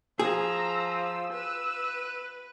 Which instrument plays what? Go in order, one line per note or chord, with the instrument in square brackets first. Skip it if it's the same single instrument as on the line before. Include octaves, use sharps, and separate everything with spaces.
[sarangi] F3 [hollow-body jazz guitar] G#4 [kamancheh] A#5 E6
[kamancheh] E6
[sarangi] B4 [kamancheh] E6